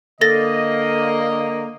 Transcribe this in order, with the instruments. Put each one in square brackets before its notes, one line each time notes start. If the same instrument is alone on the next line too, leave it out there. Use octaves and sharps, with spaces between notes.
[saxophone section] D3 A#3 [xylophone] A4 A6 A#6 [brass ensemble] D#5